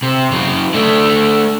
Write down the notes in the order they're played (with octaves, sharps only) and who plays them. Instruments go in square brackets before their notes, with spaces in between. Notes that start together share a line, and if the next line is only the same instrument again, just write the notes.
[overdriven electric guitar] C3
C#3 F#3
A3 D4